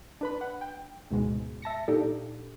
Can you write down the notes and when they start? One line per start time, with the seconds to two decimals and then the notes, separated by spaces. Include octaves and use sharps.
0.21 D4 B4 B5
0.41 F#5
0.61 G5
1.11 D2 G#2 B2 G#3
1.62 E5 A5 A#6 C#7
1.88 A#2 D4 D#4 G4 A4